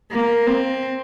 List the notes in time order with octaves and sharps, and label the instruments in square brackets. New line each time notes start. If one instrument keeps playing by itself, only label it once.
[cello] A#3
C4